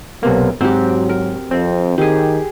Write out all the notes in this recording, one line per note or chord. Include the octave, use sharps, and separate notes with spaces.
B1 C3 A#3 B3
G#2 F#3 C4 F#4 G4
A#4
F2 C4
D#3 G4 G#4